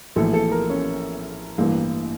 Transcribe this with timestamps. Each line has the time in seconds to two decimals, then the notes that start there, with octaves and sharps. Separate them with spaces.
0.16 A#1 A2 E3 A4
0.33 A4
0.52 A#4
0.70 C#4
1.58 A1 G2 E3 A#3